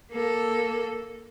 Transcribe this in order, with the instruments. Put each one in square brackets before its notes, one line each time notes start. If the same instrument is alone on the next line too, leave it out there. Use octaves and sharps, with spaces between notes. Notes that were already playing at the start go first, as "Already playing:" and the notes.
[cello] A#3 A4